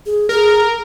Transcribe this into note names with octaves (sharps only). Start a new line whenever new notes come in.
G#4
G#4 A#4